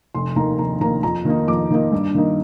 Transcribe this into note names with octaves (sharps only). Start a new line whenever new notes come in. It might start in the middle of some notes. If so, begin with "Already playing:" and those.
F1 C6
D#2 D#3 A#3 A#5
F1 A#5
D#2 D#3 A#3 A#5
F2 A#5
D#3 A#3 D#4
F2 D6
D#3 A#3 D#4
G2
D#3 A#3 D#4